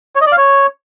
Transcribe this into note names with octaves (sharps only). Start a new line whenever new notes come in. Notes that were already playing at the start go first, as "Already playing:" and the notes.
C#5
D#5
D5
F5
C#5